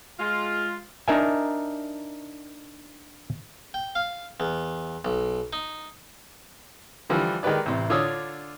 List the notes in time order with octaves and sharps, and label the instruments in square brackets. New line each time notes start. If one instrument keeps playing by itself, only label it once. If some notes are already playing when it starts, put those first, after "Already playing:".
[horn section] G#3 F4
[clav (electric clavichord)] D4 D#4 A#4 E5 G#5
[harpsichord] G5
F5
E2
B1
D#4
[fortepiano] D3 E3 F3 G3 F4
D#3 G#3 G4 B4 D5
A1 C3
D3 F4 C#5 D5 D#6 E6